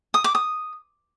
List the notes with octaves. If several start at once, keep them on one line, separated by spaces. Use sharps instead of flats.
D#6
D6
D#6